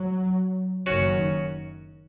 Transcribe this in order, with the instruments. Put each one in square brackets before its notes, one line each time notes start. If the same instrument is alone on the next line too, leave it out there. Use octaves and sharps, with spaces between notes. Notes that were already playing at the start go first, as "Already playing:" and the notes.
Already playing: [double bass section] F#3
[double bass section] F#1 F#2 D#3 [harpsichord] C#4 F#4